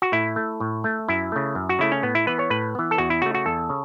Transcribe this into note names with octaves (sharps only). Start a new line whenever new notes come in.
F#4
A2 E4
A3
A2
A3
F#2 E4
C#3 A3
F#2
F#4
C#3 A3 E4
C#4
A2 B3
E4
E3 B3 B4
C#5
A2 B4
E3 B3
A4
E2 F#4
E4
C#3 A3 F#4
F#4
E2 A4
C#3